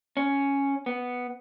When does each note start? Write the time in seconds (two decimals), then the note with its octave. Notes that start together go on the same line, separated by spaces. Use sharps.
0.17 C#4
0.86 B3